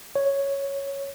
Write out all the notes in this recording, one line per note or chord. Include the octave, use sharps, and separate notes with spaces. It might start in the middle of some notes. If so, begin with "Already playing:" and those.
C#5